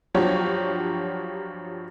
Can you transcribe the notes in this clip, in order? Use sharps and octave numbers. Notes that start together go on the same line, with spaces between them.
G2 F3 F#3 F4 G4 C#5